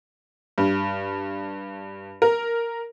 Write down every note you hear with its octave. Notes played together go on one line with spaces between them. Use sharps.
G2
A#4